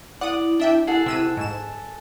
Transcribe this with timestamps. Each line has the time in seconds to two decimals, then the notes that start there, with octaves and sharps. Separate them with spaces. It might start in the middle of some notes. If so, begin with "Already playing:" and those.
0.21 E4 D5 F#5 D#6
0.60 D4 E5 G5
0.87 G#4 A4 F#5
1.06 C3 E6 D#7
1.37 G#2 E7